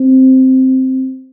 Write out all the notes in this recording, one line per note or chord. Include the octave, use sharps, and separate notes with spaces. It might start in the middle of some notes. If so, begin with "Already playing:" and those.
Already playing: C4